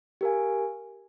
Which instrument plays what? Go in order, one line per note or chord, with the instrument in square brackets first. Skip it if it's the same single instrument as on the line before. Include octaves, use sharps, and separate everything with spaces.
[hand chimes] G4 A#4 F5 G#5